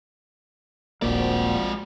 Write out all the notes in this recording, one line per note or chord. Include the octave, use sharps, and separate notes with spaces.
D#1 A#1 F3 G#3 A#3 C4 F#4 D5